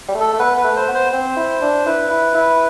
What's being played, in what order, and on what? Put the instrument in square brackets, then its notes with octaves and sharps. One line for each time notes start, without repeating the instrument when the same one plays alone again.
[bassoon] G3
A3
[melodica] A4
[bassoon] A3
[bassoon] B3 [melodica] B4
[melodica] B4
[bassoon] A3
[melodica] C5
[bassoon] B3
[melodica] C5
[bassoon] C4 [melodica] C5
[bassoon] E4
D4
[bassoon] E4 [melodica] B4
[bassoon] E4
E4